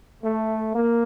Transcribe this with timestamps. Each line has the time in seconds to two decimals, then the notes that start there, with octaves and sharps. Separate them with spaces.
0.23 A3
0.74 A#3